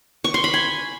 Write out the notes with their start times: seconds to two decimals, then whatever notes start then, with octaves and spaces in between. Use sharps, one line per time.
0.24 C#6
0.34 C6
0.44 B5
0.54 G#5